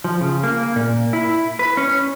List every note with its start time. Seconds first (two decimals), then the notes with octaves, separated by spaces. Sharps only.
0.04 F3
0.21 C#3
0.43 A#3
0.76 A#2
1.13 E4
1.59 B4
1.77 C#4